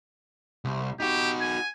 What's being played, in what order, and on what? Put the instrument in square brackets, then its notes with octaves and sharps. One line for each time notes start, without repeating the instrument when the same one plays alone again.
[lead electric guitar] C2
[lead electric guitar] D#4 F#4 [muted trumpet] G4
[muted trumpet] G#5